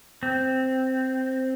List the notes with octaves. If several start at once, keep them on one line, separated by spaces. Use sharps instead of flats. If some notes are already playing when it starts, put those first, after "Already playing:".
C4